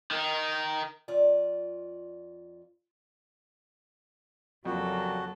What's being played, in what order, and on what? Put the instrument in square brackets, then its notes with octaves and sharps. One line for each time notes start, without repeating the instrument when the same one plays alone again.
[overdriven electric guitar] D#3 D#4
[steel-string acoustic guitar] F2 F4 D5
[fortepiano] F2 [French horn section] C#3 G3 A#3 [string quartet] F#3 A4 [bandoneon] F#4